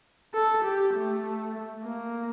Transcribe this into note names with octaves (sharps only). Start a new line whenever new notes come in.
A4
G4
A3
A#3